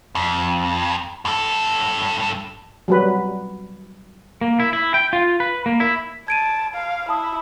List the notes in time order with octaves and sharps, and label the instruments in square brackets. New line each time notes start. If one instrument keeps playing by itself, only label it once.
[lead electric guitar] F2
G2 A4
[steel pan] F#3 G3 B4
[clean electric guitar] A#3
E4
E4
G5
F4
B4
A#3
E4
[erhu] A5 [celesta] G#6 D7 D#7
[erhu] F5
[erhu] E4 [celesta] A5 D#6